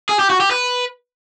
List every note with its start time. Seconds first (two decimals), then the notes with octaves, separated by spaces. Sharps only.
0.09 G#4
0.19 G4
0.30 F#4
0.40 G4
0.51 B4